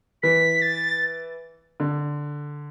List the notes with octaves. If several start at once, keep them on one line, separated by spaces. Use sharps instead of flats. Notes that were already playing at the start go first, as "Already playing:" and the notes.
E3 B6
A6
D3